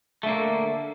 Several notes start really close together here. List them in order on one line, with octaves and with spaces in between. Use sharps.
A3 D3 A#3